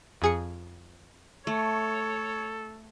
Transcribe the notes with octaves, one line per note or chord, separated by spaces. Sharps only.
F2 G#4 C#7
A3 A4 C#5